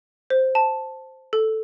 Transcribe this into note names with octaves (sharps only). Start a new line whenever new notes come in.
C5
A5
A4